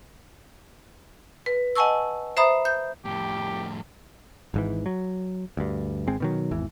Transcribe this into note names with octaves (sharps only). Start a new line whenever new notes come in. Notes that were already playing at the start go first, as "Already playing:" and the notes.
B4
D#5 F#5 G#5 A5 C#6 E6
C5 E5 A#5 B5 D#6
G6
F2 A2 G4
G#1 G#2 E3
F#3
D2 G2
G#1 G#3 C4
B2 D#3 F#3
G#1 E2 E3